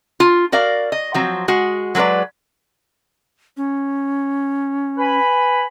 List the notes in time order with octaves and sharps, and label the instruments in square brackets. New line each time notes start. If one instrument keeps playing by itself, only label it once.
[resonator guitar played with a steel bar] F4
F#4 A#4 D5 F5
D#5
F3 F#3 C4
G#3 F#4
F#3 G#3 A#4 B4 D5
[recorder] C#4
[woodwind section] B4 G#5 B5